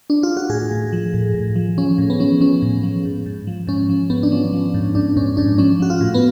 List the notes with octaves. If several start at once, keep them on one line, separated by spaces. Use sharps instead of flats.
D4
F4
F#4
A2 G#4
A2
F3
A2
A2
F3
F3 C#4
A2
B3
F3 C#4
F3 C#4
A2
F3
G#2
G#2
F3
G#2 C#4
F3
G#2 B3
D4
F3 C#4
F3
G#2
G#2 D4
G#2 C#4
G#2 D4
F3 C#4
F3 F#4
F4
A2
B3